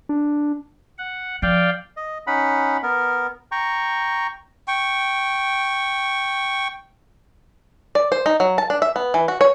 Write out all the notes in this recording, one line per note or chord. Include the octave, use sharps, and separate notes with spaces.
D4
F#5
F3 D5 F5 G5
D#5
C#4 D#4 F#5 B5
B3 A#4
G5 A#5 C#6
G5 C#6
D5
C5
D#4
F#3
A5
D4
E5
B3
E3
F#4
C#5